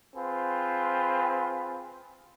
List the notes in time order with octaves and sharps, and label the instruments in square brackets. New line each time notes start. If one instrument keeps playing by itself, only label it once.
[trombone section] C4 F4 G#4 B4